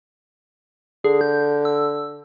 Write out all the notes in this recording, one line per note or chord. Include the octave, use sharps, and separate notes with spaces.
D3 G#4
G6
E6